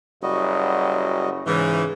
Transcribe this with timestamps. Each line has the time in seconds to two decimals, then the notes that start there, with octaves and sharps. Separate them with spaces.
0.23 F#1 G3 F#4 D#5
1.47 G#2 C#3 E3